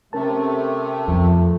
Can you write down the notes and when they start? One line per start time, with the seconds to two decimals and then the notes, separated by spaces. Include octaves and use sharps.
0.13 C3 A3 C#4 A#4 A5
1.08 F2